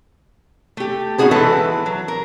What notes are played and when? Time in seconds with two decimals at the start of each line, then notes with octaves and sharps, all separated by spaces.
0.77 A3 G4
1.18 B3 C#4 D#4 F#4 G#4 B4
1.31 E3 G#3 E4 A4 B4
1.86 F#3
2.08 A#4